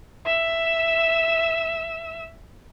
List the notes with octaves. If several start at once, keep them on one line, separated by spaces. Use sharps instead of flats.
E5 E6